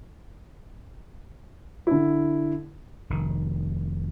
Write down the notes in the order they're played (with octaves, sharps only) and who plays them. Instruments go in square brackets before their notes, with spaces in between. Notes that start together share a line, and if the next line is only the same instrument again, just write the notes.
[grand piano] D3 E4
[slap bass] F1 D#3